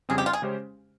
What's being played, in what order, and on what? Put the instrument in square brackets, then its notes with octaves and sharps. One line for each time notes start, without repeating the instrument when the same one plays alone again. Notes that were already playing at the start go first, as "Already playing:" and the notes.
[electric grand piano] F2 C#3 G3 C4 [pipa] G#4
[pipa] G4
F4
G#4
[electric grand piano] C#3 G#3 C#4 G4 C5